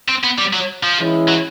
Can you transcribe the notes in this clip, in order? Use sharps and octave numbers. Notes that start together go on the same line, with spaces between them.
C4
B3
G3
F#3
F3
E3 G#3 C#4 E4
F#3